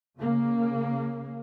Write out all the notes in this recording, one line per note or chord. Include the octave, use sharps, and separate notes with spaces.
C#3 A#3